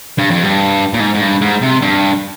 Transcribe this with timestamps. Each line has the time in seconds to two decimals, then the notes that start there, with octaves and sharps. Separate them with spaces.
0.19 G2
0.31 F2
0.44 G2
0.94 A#2
1.00 G#2
1.14 G#2
1.21 G2
1.41 G#2
1.62 C3
1.82 G2